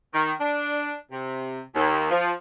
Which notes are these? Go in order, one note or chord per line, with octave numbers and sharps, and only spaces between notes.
D#3
D4
C3
D#2
F3